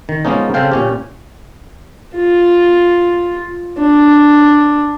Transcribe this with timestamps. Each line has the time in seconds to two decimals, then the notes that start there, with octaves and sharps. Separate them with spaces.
0.09 D#3
0.25 F3 G#3 A#3 B3 C#4 D#4
0.54 C#3 C4 A4 F5 G5
0.72 A#2 C#4 G4
2.16 F4
3.80 D4